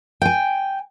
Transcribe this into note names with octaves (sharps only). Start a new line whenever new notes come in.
G5 G#5